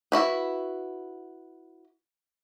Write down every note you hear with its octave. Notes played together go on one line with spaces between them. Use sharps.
E4 F#4 B4